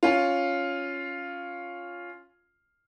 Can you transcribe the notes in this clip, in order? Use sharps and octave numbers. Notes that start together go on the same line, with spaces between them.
C#4 F4